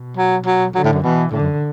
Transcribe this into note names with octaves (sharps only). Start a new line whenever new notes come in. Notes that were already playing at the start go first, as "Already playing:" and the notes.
Already playing: B2
F#3
F#3
D3 F#3
A2
F#2
B2 E3
A2 D3
F#2